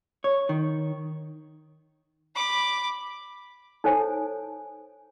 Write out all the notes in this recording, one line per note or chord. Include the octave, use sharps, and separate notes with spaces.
C#5
D#3
B5 D6
D#4 A4 C5 C#5 G#5 A5